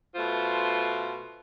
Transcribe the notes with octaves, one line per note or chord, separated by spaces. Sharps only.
B2 A3 F4 C5